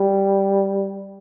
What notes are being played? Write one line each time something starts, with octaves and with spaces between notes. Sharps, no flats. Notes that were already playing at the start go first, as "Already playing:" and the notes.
Already playing: G3